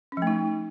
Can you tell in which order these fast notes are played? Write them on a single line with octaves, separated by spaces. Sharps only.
C#4 F3 A3 D#4